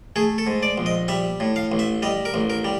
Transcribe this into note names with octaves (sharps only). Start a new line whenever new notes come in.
A3 G#4
A4
G#2
D5
A#1
D#5
G3 E5
A2
F5
A1
E5
G3 D#5
A#4
A1
A#4
G3